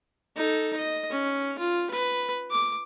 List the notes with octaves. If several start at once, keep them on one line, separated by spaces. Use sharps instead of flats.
D#4 A4
D#5
C#4
F4
B4
D6